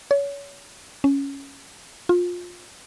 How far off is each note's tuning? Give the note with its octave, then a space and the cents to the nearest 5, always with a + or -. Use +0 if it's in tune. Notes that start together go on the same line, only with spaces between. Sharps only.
C#5 +30
C#4 +0
F4 +20